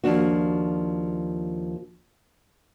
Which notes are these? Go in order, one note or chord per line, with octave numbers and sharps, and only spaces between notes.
D#2 F3 D4 F#4